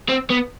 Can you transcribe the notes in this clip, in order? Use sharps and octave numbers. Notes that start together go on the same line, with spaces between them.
C4
B3